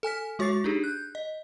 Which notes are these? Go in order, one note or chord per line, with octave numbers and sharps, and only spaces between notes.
A4 G#5 F6 B6
G#3 F#4 C#5 C#6 A6 C7
D4 D#4 G4 G#4
F#6 G6
D#5